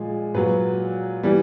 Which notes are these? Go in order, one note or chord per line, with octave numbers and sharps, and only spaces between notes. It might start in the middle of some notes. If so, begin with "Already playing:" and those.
Already playing: A#2 F3 G#3
A#2 F#3 B4
E3 G3